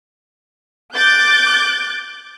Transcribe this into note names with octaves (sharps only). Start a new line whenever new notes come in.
D6 F#6 G6 A6